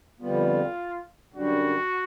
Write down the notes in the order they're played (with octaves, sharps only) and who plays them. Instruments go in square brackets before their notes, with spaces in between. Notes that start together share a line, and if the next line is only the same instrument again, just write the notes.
[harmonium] F2 D3 G3 B3 [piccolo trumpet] F4
[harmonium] F#2 D3 G3 [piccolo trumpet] F#4